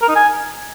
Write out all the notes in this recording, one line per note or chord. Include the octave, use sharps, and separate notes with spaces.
A#4
D#4
G#5